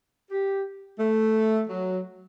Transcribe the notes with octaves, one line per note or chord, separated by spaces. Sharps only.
G4
A3
F#3